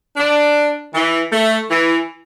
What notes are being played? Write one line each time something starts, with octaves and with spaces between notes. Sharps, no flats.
D4
E3
A3
E3